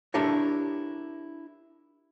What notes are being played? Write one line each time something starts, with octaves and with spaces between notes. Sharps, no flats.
D4 E4 G4 A4 A#4 C#5